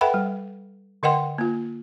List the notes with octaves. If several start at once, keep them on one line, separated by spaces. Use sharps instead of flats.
A4 B4 E5 F#5 G5 B5
G3
D3 A#4 D#5 F#5 G5 C6
A#3 F4